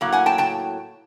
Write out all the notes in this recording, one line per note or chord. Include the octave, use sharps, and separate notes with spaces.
A2 F#3 A#3
F#5 G#5
G5 A5
G5 A5